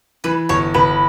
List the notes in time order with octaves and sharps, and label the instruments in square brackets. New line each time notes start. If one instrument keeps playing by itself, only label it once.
[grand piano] E3 [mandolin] B4
[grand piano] G1 [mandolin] C#5
[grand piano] G1 [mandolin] B4